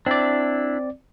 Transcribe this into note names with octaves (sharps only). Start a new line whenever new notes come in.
C4 D4 E4 D5